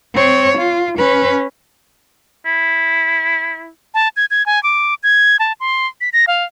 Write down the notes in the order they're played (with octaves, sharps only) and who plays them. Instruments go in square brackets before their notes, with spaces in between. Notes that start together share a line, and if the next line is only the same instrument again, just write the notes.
[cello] C4 C#5
F4
C#4 B4
[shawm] E4
[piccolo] A5
G#6
G#6
G#5
D6
G#6
A5
C6
B6
A#6
F5